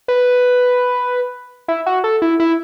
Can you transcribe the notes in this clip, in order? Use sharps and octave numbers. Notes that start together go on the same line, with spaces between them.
B4
E4
F#4
A4
E4
E4